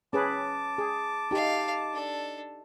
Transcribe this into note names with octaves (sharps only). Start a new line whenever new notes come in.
C#4 G#4 B4 A5 D6
G#4
D#4 G4 A4 F5
D4 A4